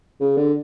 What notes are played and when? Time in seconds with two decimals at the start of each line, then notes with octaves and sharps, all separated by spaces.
0.20 C#3
0.37 D3